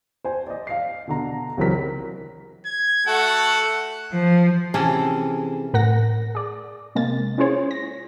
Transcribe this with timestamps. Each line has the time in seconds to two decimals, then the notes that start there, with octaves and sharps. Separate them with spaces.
0.25 C5 G#5
0.47 D5 D#5
0.67 F5 C7
1.07 B2 D3 A#5
1.57 C#2 E3 F#3 C4 A#4 B6
2.66 G#6
3.07 A3 F#4 A4 F#5
4.13 F3
4.74 C3 E3 C#4 G#4 A4
5.73 A2 A#4 F#5 A#6
6.35 G#4 D5
6.95 C3 G#3 A#3 A6
7.38 C#4 E4 F4 G#4 C5 C#5
7.71 A#6